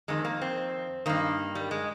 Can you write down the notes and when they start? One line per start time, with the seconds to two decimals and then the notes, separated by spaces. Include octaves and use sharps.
0.08 F2 D#3 G#3
0.25 A#3
0.42 C4
1.06 G2 D#3 A#3
1.55 G3
1.71 G#3